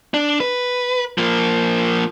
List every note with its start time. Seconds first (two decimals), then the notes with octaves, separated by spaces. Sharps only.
0.14 D4
0.40 B4
1.18 F3 A#3